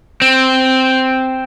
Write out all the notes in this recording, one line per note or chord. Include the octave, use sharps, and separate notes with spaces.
C4